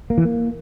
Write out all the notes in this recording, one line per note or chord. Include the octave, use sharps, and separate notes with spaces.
A#3
E3
A#3